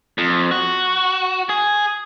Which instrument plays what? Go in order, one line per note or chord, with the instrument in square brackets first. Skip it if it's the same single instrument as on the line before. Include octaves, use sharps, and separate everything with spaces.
[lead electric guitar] F2
F#4
G#4